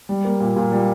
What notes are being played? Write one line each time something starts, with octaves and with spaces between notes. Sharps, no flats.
G3
A#3
A#2
A#2
G3